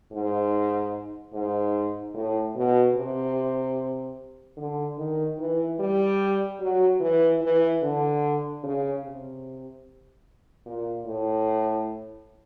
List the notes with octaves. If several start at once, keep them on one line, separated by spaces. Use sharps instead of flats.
G#2
G#2
A2
B2
C3
D3
D#3
E3
G3
F#3
E3
E3
D3
C#3
C3
A#2
A2